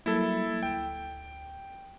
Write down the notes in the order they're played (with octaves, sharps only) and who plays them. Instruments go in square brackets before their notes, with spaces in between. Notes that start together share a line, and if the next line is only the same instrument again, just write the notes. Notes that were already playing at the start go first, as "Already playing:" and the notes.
[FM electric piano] F#3 G3 A#3 [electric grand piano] E4 A4
[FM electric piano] D2 [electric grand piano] G5